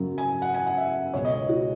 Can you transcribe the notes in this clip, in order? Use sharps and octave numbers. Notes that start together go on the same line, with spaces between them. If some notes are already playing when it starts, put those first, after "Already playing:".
Already playing: F#2 C#3 F#3
G#5
F#5
G#5
F#5
E5
C#2 B2 G#3 C#5
D#5
C#5
F#4